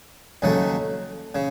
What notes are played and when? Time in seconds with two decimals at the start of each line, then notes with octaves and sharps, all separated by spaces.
0.42 D#2 C#3 F#3 A3
1.35 C#3